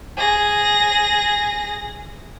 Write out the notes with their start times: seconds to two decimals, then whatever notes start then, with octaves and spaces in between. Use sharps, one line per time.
0.17 G#4 A#6